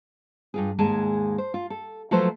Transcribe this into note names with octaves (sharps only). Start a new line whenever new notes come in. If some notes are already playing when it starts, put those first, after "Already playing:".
G2 F4 G#4
D#2 G#2 G#3 G#4 G#5 A5
C5
F4
A4
F3 F#3 A3 A4 B4 C5